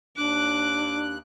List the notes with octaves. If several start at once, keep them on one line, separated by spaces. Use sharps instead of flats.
D#2 D4 D6 F#6